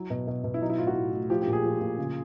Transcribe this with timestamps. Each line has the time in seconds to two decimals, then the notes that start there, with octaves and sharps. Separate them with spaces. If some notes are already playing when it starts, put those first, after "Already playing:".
Already playing: F#3 E4
0.10 B2
0.27 B2
0.44 B2
0.54 E4
0.61 F#3 D#4
0.70 E4
0.78 A2 F4
0.87 F#4
0.95 A2
1.13 A2
1.30 F3 G4
1.42 G4
1.47 A#2
1.53 G#4
1.64 F3
1.81 A#2
1.98 C#3